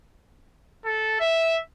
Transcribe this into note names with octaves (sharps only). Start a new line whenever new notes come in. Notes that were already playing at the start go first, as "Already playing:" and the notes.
A4
E5